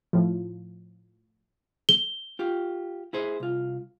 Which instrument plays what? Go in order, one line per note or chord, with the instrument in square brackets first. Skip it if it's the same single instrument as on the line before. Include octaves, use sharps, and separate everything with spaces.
[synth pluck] A2 F3
[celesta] G7
[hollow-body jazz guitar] F4 G4
E4 G#4 C5
C2 F4